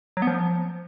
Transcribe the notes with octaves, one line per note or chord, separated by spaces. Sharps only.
F#3
B3
F3